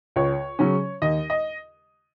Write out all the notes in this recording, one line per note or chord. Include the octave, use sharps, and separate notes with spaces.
C#2 C#5
C#3 F#3 C#4
D#2 D#5
D#5